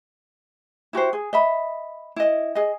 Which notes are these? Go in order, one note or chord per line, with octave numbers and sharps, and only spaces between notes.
E4 F#4 G4 C5
G#4
D#5 E5 B5
E4 D#5
G#4 D#5